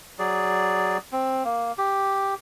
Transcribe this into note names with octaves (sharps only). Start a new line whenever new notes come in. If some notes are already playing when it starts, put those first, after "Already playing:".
F#3 G#4 D5
C4
A#3
G4